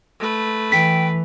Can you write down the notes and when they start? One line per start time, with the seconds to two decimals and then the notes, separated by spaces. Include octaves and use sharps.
0.19 A3 B4
0.72 E3 G5 B6